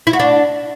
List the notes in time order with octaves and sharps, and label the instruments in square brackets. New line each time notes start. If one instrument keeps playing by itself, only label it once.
[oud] E4
F#4
D4